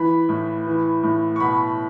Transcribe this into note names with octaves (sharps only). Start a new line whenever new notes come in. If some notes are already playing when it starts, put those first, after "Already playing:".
Already playing: E3 B5
A2
E3
A2
C#6
B2 B5